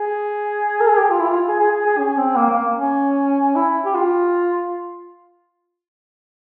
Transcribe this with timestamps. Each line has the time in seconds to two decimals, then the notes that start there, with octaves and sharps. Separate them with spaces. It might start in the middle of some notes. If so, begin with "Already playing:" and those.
Already playing: G#4
0.80 A#4
0.89 G#4
0.99 G4
1.10 F4
1.20 E4
1.28 F4
1.48 G#4
1.59 G#4
1.71 G#4
1.85 G#4
1.98 C#4
2.17 C4
2.36 A#3
2.50 A#3
2.76 C#4
3.56 E4
3.85 G4
3.94 F4